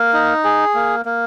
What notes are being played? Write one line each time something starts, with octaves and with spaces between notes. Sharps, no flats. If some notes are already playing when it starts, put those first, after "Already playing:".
Already playing: A#3
D#4
G#4
A#3
A#3